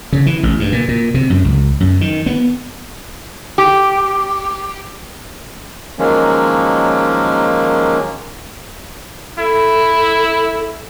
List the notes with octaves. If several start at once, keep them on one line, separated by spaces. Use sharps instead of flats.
C#3
E3
A1
G2
A#2
A#2
C3
F#2
C#2
F#2
D#3
B3
G4
D#3 F3 F#3 G#3 A#3 C#4
E4 A4